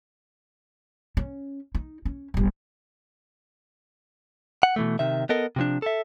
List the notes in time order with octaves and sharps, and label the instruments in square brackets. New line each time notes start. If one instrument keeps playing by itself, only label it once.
[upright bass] C#4
D#4
C#4
D1 G1
[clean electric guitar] F#5
B2 E3 A3
C3 D#3 E5
B3 A4 A#4 D#5
C3 F3 D4
A4 E5